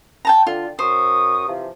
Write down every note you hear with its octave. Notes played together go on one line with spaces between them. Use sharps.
G5 A5 A#5
D3 F4
F#2 C5 C#6 D#6
C3 E3 F3